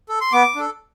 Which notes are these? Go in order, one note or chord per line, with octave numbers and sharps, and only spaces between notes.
A4
C6
B3 D6
D4 A4